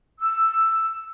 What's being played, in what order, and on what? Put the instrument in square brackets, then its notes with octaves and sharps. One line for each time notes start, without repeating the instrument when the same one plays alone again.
[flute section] E6